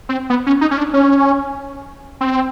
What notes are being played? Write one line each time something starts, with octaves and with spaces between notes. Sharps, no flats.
C4
B3
C#4
D#4
C#4
D4
C#4
C4